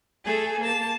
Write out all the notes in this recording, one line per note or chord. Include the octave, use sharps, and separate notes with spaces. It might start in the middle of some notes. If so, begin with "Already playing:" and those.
A3 G#4 A4
A#3 A5